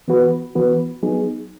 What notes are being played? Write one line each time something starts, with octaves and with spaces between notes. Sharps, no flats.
E3 B3 F#4 B4
E3 B3 F#4 B4
F#3 B3 D#4 G#4